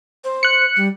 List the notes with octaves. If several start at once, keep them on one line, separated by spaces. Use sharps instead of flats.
C5
F#6 C#7
G3